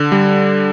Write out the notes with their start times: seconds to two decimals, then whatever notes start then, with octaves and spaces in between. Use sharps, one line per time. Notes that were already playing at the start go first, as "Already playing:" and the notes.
Already playing: D3
0.12 G3